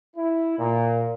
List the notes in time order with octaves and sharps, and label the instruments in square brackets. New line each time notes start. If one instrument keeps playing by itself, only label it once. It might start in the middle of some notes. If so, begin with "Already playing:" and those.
[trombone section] E4
A#2